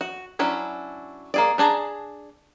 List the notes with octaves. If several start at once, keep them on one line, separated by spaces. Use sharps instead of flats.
F#4
F#3 C#4 D4 E4
A#3 G#4 D5
B3 D4 G#4 A5 A#5